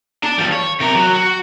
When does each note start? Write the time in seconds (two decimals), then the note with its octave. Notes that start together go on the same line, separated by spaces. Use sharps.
0.23 D4 A5
0.38 F3 G3
0.53 C#5
0.80 C3 A#4
0.96 F#3
1.14 F#4